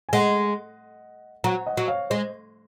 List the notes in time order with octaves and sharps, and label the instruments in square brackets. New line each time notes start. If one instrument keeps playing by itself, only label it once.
[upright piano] G#5
[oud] G#3 [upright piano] D#5 F#5
[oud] F#3 [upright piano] F#5 A#5
[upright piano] D#5 F#5
[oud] F#3
[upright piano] C#5 F5
[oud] G#3 [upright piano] C5 D#5